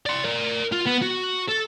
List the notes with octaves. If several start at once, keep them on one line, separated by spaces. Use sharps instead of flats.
D5 C6
A#4 D5
F4
B3
F#4
A4